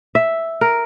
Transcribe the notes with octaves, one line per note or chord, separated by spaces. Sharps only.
E5
A#4